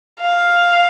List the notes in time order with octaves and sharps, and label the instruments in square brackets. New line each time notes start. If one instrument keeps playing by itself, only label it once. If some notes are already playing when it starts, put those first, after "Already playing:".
[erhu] F5